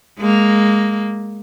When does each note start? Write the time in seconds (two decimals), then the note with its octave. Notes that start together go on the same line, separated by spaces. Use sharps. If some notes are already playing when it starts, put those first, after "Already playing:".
0.19 G#3 A#3